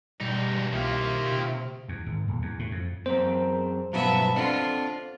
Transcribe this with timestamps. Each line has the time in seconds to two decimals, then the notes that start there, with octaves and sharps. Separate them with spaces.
0.21 E2 G2 B2 G3 D#4
0.73 C2 D#3 A#3 F4 G4 E5
1.32 C3
1.88 E2
2.06 G#1
2.28 D#1
2.42 E2
2.59 A2
2.71 F2
3.06 F#2 C4 G#4 A#4 C5 A#5
3.93 G2 B2 F#3 B3 E5 F5 A5 B5
4.36 C4 D4 F4 A4 F#5